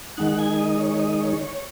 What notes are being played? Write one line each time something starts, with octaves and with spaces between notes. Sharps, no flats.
D#3 G#3 D#4 F#5
G#5
D#5
C#5
C#5
D#5
C#5
C#5